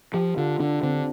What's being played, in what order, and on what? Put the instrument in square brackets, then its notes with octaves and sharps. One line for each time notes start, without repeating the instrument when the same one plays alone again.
[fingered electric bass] F3 [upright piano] G4
[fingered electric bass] D3 [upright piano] F4
[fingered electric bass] D3 [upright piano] D4
[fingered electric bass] D3 [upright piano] C4